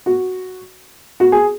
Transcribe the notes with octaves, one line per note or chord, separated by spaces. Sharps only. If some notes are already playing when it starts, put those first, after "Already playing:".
F#4
F#4
G#4